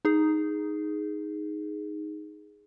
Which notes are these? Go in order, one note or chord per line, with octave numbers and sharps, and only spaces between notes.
D#4 G#4